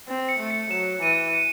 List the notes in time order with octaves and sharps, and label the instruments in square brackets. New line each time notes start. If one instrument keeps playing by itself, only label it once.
[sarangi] C4
[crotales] C#7
[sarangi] A3
[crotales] C#7
[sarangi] F#3 [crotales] E7
[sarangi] E3 [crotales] D#7
[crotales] C#7